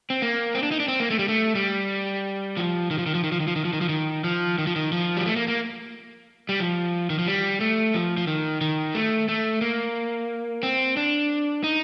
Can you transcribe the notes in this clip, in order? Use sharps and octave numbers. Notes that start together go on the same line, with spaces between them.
C4
A#3
C4
D4
D#4
D4
C4
A#3
A3
G3
A3
G3
F3
D#3
F3
D#3
F3
D#3
F3
D#3
F3
D#3
F3
D#3
F3
D#3
F3
D#3
F3
D#3
F3
G3
A3
A#3
A#3
G3
F3
D#3
F3
G3
A3
F3
F3
D#3
D#3
A3
A3
A#3
C4
D4
D#4